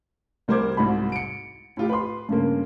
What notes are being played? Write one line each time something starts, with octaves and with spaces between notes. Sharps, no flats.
C2 G3 A#4 C5 D6 G#6
C2 G#2 F#4 B5
C#7 D7
A2 F4 G4
B4 C6
G2 C#3 A#3